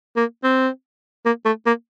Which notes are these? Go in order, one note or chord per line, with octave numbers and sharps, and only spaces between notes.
A#3
C4
A#3
A3
A#3